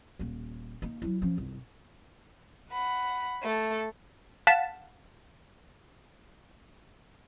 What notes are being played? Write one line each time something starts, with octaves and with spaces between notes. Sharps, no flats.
D#1 A#3
A#3 D#4
F#3 E4
F3 C#4
G1 C2
F#5 B5
A3 A4
F5 F#5 A5 A6 B6 E7